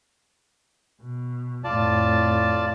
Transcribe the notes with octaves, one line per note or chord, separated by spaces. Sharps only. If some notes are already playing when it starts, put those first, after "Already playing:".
B2
F2 A2 F4 D5 A5